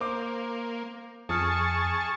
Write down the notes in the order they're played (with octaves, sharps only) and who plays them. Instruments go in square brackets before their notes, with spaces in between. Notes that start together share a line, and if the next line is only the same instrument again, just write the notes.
[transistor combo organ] A#3 [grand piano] C5 D6
[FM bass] F2 [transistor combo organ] G#4 A5 C#6 [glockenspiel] D#6 F6 C#7